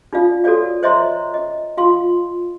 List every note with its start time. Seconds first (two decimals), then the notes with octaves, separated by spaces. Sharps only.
0.13 D#4 F4 D5 F5
0.44 F#4 A4 A#4 C#5 D5 F5
0.83 C5 C#5 D#5 E5 A#5 C6
1.34 D#5
1.77 F4 F5 C6